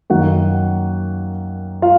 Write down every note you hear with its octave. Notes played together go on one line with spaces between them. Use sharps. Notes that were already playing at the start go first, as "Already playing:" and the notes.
F#2 D#3 A#3 F#4 F#5
F4 F5